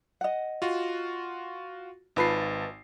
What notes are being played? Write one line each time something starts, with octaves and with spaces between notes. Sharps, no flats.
D#5 F#5
F4 F#4
G#1 D#4 F4 B4 A5 C7